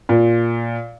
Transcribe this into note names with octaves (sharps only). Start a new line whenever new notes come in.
A#2